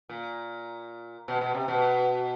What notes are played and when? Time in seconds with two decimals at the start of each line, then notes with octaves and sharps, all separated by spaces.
0.09 A#2
1.28 B2
1.41 B2
1.55 C3
1.68 B2